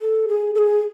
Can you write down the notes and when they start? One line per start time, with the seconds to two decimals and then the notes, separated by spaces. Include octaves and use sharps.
0.02 A4
0.28 G#4
0.55 A4
0.58 G#4